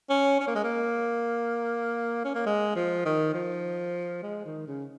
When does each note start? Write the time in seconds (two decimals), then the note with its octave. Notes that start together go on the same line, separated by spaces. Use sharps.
0.10 C#4
0.40 C#4
0.47 A#3
0.55 G#3
0.64 A#3
2.25 C#4
2.35 A#3
2.46 G#3
2.76 F3
3.05 D#3
3.34 F3
4.23 G#3
4.46 D#3
4.67 C#3